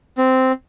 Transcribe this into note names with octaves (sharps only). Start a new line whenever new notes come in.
C4